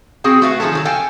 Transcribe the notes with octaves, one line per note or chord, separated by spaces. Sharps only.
C4 F#4 G#4 F5 G5
A3 F#4 B4 E5 F5
D#3 F3 G#3 G#4 A4
D#3 F3 F#3
A4 F5 G5 G#5